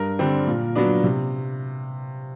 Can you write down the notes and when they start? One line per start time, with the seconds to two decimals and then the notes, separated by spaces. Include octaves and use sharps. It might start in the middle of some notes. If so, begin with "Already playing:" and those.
Already playing: G2 A#4
0.19 D3 G3 C4
0.47 A#2
0.76 F#3 B3 D4
1.04 C3